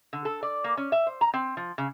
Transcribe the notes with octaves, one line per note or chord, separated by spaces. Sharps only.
D3
A4
D5
A#3
C#4
E5
C5
A#5
C4
F3
C#3